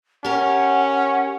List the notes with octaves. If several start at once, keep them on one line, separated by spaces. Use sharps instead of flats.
C#4 G4 A#4 F#5